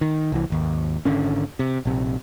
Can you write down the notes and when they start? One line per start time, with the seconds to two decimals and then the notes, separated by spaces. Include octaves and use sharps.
0.01 D#3
0.32 C2 E3
0.50 G#1 D#2
1.05 G#1 D3 C#4
1.59 C3
1.85 A#1 C3